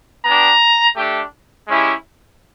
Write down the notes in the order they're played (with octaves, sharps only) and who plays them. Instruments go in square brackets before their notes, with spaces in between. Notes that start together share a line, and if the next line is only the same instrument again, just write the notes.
[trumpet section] B3 D4 G4 A#5
A3 D4 G4
G#3 C#4 E4 G4